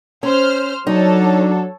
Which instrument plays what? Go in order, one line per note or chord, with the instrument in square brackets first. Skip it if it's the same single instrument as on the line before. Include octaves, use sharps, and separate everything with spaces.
[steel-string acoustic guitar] C#4 [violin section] C5 F6
[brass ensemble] F#3 D4 [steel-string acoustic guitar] D#4 [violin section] A4 C#5